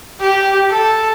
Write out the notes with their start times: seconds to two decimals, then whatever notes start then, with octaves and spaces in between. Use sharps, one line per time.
0.20 G4
0.71 A4